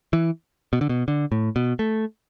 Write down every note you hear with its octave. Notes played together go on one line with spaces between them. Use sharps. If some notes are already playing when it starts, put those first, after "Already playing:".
E3
B2
D3
B2
D3
A2
B2
A3